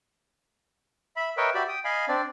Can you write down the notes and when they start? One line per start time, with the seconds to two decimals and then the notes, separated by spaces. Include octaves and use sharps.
1.16 E5 B5
1.37 A#4 B4 C#5 D#5 E5 G5
1.54 F#4 G4 D5 E5 B5
1.68 G5 D#6
1.85 D#5 F5 G#5 B5
2.08 C4 D4 D5